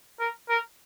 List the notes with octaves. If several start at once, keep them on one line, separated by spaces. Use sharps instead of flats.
A#4
A#4